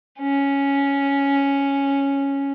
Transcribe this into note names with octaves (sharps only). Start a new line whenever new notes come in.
C#4